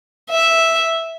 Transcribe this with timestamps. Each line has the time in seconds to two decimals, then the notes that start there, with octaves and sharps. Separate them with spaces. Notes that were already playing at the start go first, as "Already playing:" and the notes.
0.31 E5